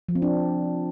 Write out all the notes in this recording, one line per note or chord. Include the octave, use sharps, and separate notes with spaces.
F3
C4
D4